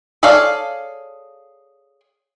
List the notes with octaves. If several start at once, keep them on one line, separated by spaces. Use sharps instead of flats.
G#4 A4 C#5 D5 F5